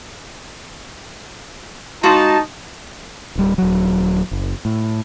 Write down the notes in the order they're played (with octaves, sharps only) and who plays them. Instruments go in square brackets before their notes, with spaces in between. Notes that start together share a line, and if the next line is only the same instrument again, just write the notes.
[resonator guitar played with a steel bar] G#3 F#4 F5 [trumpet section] D#4 A5
[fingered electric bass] D1 G3
D#1 F#3
F#1
A2